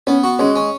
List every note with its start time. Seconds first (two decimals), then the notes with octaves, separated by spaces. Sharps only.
0.07 B3 C#4
0.24 F#4
0.39 G#3 C#4
0.56 C#4